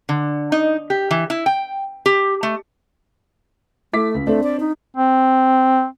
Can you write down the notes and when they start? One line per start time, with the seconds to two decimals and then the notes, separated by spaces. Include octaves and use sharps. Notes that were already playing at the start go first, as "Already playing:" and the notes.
0.09 D3
0.52 D#4
0.90 G4
1.11 E3
1.30 E4
1.46 G5
2.06 G4
2.43 A3
3.93 A3 E4 D6 B6
4.14 C#2
4.27 A3 C4 D4
4.43 D5
4.60 D#4
4.97 C4